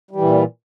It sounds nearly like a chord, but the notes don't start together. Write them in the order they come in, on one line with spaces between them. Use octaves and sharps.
G3 E3 A#2